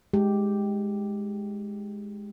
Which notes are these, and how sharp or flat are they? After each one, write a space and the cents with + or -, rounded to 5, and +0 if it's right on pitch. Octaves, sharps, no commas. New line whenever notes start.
G#3 +0 G4 +0